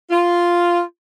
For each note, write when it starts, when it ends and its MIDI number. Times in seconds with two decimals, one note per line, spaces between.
0.11 0.81 65